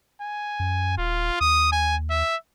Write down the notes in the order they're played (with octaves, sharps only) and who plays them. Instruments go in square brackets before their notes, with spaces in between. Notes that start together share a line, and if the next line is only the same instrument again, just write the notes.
[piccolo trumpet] G#5
[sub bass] F#2
[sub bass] D#1 [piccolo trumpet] F4
[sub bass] D#2 [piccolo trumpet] D#6
[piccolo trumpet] G#5
E5